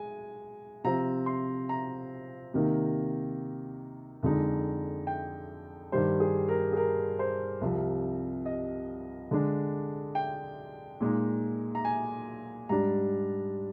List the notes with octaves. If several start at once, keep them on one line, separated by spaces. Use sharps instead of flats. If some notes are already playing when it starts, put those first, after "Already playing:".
Already playing: G#3 G#5
C3 F3 C4 F4 A#5
C6
A#5
C3 D#3 A#3 D#4
F2 D3 G#3 D#4
G5
G2 D#3 G3 C5
G#4
A#4
G#4
A#4
C5
C2 C3 F3
D#5
D3 G#3 D4
G5
A#2 G#3 D#4
A#5
G#5
G#2 G3 D4 A#5